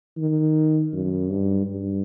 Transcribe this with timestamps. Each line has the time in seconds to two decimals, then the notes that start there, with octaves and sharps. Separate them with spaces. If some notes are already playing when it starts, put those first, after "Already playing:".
0.18 D#3
0.93 F#2
1.30 G2
1.67 G2